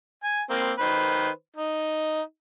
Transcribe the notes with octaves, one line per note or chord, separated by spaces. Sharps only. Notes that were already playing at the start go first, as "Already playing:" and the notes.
G#5
A#3 C4
D#3 B4 C5
D#4